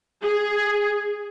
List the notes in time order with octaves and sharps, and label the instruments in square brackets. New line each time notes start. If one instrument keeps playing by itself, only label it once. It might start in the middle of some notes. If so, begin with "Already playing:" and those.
[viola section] G#4